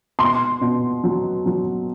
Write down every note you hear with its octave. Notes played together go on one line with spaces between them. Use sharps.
B2 C6
B2
F#3
F#3